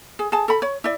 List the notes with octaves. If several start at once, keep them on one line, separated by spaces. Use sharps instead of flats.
G#4
G#4 A5
A4 B5
C#5
E4 D5